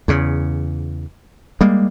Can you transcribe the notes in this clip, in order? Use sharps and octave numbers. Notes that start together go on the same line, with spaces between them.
E2 C#3
G3 G#3 A#3